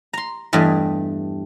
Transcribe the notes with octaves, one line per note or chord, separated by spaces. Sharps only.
A#5 C6
E2 G2 A3 G4 D#5 G#5